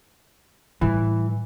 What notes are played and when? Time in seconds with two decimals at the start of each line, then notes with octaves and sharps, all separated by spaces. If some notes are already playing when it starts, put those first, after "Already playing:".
0.81 A2 E3 G3